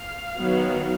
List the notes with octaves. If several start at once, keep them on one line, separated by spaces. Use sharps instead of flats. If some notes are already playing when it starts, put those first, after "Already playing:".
Already playing: F5
D#3 F#3 B3